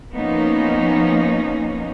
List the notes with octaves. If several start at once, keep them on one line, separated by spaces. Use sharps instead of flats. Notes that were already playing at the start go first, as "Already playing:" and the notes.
F3 A#3 B3 C#4 D#4